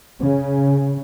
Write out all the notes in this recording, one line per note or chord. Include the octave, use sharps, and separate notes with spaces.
C#3